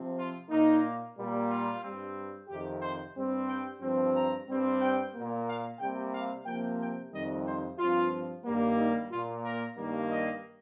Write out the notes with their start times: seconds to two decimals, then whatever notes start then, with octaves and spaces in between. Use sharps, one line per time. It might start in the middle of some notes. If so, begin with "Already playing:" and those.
Already playing: C3 F3 C4
0.17 F4
0.50 A#2 A#3 D#4
1.16 A#2 G3 A#3
1.49 F4
1.82 G2 G3 C4
2.49 F2 C3 D#3 G4
2.82 C5
3.15 G2 G3 C4
3.48 G5
3.81 G2 F3 C4
4.14 A#5
4.47 G2 G3 C4
4.80 G5
5.14 A#2 A#3
5.46 F5
5.80 C3 G3 A#3 G5
6.13 F5
6.46 C3 F3 A#3 G5
6.79 G5
7.12 F2 C3 D#3 G3 D#5
7.45 C5
7.78 G2 F3 C4 F4
8.45 G2 D#3 G3 A#3
8.78 D#4
9.11 A#2 A#3 F4
9.44 A#4
9.77 G2 D#3 G3 A#3
10.11 D#5